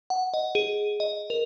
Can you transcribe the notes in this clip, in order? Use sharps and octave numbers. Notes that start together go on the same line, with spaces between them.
F#5
D#5
G#4
D#5
A#4